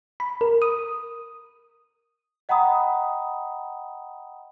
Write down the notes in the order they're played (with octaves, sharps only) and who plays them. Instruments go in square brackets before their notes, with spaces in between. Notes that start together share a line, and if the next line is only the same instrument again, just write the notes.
[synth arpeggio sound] B5
A#4
D#6
[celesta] D#5 F#5 G5 A#5 B5 D#6